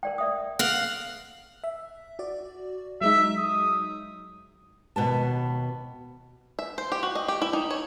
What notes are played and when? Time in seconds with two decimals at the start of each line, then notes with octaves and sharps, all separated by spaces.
0.03 A#4 D5 G5
0.18 D5 E5 D#6
0.59 F5 F#5
1.64 E5
2.19 F#4 D5
3.01 F#3 G#3 D#4 E5
3.38 D#6
4.96 D#2 B2 B3 A5
6.59 E5
6.78 C5
6.92 G4
7.03 F#4
7.15 D#5
7.28 G4
7.42 E4
7.53 D#4
7.71 C#5